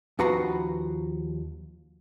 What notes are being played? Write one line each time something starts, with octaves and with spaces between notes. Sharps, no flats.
D#2 F3 F#4 B4 A#5 C6